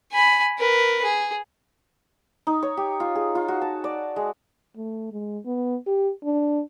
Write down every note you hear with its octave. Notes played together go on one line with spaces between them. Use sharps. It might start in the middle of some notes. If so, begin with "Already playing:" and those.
G#5 B5
A#4 B4
G#4
D#4
C#5
G4
F4
G#4
F4
F#4
A5
D5
G#3
A3
G#3
B3
G4
D4